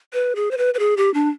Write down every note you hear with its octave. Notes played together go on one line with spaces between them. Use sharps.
B4
G#4
C5
B4
B4
G#4
G4
D4